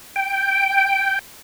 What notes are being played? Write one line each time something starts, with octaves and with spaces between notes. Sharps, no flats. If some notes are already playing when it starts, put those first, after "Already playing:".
G5